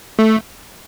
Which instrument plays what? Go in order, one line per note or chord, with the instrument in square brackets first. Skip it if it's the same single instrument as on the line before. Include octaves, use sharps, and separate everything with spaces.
[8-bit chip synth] A3